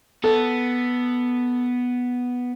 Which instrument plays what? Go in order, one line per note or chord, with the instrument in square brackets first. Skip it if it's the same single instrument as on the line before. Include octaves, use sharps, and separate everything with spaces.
[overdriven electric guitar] B3 [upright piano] A4